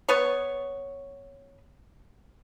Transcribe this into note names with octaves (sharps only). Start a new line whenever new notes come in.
B3 C#5